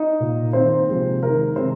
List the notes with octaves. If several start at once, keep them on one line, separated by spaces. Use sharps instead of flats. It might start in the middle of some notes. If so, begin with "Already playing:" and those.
Already playing: D#4 D#5
A#2 A#3
D#3 A#3 C4 C5
C3 F3 G#3 C4
D#3 G#3 C4 A#4
C3 D#3 G#3 C4 C5